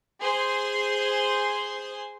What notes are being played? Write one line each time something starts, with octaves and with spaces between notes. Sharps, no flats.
G#4 C5 C6